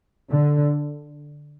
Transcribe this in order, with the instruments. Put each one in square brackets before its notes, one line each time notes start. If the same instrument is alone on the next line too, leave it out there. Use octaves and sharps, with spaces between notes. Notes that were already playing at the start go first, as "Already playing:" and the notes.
[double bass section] D3